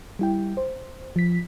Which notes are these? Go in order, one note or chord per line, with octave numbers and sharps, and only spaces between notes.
G3 E4 G5
C5
F3 B6